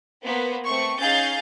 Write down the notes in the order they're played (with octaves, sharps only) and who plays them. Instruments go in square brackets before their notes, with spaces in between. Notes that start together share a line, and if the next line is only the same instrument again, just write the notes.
[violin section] A#3 B3 B4 C5
A3 C4 C#6
C#4 D#4 G#4 F5 G6 A6